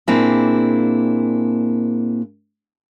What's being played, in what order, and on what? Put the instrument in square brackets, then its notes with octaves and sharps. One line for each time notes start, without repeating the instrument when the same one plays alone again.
[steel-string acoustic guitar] A#2 A#3 C4 D4 E4 G#4